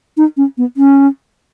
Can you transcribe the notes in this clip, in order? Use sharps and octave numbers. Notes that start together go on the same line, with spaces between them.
D#4
C#4
B3
C#4